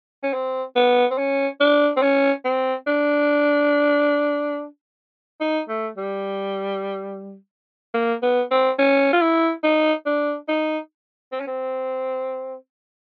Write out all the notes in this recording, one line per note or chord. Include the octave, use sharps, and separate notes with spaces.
C#4
C4
B3
C4
C#4
D4
C4
C#4
C4
D4
D#4
A3
G3
A#3
B3
C4
C#4
F4
E4
D#4
D4
D#4
C4
C#4
C4